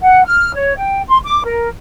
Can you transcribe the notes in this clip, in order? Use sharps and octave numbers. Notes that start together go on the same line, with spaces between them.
F#5
F6
C#5
G5
C6
D6
A#4